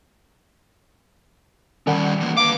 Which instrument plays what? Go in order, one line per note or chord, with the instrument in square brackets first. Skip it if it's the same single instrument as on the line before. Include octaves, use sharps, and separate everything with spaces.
[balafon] D#3 [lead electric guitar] G3 C#4 [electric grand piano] D5 F#5
[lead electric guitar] E3 A#3
[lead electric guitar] B4 F5 [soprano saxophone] D6